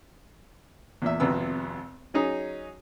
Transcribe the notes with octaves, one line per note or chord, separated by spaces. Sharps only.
E2 A#2 E5
G#1 F2 C3 B3 E6
F#3 C#4 D#4 G#4